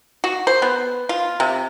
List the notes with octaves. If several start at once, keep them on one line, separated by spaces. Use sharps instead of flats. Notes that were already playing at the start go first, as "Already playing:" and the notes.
F#4
C5
B3
F4
C3